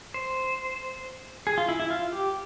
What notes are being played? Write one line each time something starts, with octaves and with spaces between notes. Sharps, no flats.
C5
G#4
F4
E4
E4
F4
G4